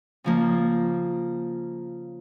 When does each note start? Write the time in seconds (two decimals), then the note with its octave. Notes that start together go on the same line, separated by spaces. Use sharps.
0.24 C#3 F3 A#3